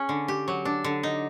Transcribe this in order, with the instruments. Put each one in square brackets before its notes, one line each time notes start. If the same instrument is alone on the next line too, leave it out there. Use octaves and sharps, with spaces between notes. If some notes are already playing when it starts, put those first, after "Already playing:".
Already playing: [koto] C#4 G#4
D3
G4
F#3
D4
D3
D#4